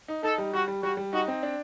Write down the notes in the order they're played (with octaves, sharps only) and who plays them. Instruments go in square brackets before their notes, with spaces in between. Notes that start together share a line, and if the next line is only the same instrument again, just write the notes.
[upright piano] D#4
[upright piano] D#4 [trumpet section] A4
[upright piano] G3
[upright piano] G3 [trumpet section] F#4
[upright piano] G3
[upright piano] G3 [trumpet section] F#4
[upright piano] G3
[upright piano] D#4 [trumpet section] F#4
[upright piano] C4
D4